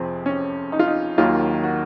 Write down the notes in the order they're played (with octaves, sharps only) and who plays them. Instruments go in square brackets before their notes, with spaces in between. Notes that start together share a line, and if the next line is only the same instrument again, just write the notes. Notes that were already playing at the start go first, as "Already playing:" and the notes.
Already playing: [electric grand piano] F2 C3 F3 [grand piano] C4 G#4
[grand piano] C#4
D#4
F4
D#4
[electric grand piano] D#2 D#3 F#3 A#3 [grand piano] F4
[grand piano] F#4